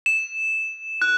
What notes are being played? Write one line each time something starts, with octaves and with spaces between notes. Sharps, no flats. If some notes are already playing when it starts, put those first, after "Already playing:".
E7
F#6